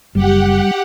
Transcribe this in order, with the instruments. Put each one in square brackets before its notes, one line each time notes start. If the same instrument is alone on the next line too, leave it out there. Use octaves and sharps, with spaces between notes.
[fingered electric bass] F#1 [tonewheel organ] G3 [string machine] G4 F#5